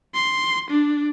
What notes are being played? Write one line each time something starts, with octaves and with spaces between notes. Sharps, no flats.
C6
D4